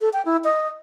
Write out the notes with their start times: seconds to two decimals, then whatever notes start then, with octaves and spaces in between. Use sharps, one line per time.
0.01 A4
0.13 G5
0.25 E4
0.44 D#5